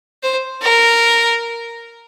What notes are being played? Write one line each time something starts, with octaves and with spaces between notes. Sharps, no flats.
C5
A#4